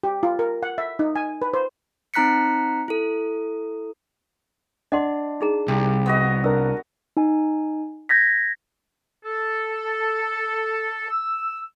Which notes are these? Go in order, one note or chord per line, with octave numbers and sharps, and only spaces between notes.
G4
F4
A#4
F#5
E5
D#4
G#5
B4
C5
C4 D#4 A#5 F#6 B6 C#7
E4 A4
D4 D#5 F#5 C6
D#4 G#4 A#5
C2 G4
B3 F#4 D#5
D4 A#4 E6
D#4 G#5
G6 G#6 A#6 B6
A4
E6